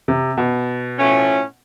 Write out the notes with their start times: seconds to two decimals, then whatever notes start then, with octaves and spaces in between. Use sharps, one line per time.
0.08 C3
0.37 B2
0.98 A2 F3 A3 C#4